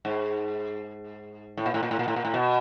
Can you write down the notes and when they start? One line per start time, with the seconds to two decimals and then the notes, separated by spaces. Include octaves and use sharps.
0.05 G#2
1.57 A2
1.66 A#2
1.74 A2
1.83 A#2
1.91 A2
1.99 A#2
2.08 A2
2.16 A#2
2.25 A2
2.34 B2